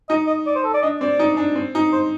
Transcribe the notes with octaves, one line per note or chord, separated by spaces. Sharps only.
D#4 D#5
D#5
D5
C5
A4
D5
D4 D#5
C4 D5
D#4
D4
C4
D#4
C5